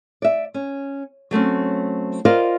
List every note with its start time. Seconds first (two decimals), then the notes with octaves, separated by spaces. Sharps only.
0.22 D5 E5
0.54 C#4
1.31 F#3 A3 C4 C#4
2.25 F4 A#4 C5 D5 D#5 F5